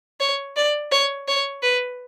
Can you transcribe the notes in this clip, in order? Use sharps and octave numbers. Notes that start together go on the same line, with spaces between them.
C#5
D5
C#5
C#5
B4